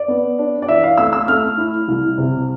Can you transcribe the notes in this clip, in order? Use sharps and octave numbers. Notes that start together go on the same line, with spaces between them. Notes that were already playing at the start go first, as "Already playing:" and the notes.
Already playing: D5
B3
D4
D5
E3 E5
F5
A3 E6
E6
A3 F6
E4
C2
C3